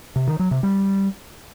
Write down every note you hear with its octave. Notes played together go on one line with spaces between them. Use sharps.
C3
D#3
F#3
C3
G3